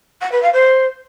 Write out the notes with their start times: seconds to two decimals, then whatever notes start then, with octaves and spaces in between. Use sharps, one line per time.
0.21 F#5
0.32 B4
0.42 F5
0.53 C5